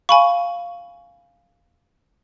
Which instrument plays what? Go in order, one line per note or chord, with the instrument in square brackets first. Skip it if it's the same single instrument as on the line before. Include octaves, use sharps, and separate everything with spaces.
[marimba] F5 [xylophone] G#5 B5 C#6